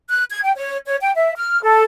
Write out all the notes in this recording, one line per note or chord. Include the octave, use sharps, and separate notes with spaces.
F#6
G#6
G5
C#5
C#5
G5
E5
F6
A4